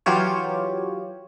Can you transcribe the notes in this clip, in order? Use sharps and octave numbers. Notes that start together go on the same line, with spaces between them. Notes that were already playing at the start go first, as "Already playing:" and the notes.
E3 F#3 F4 G4 C#5